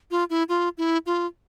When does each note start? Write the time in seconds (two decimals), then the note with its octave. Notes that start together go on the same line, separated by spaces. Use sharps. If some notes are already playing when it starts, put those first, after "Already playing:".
0.11 F4
0.30 E4
0.49 F4
0.78 E4
1.06 F4